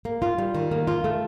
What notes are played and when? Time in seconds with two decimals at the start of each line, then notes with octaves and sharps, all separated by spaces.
0.05 A#3
0.22 F4
0.38 G3
0.55 D#3
0.71 A#3
0.87 F4
1.04 A3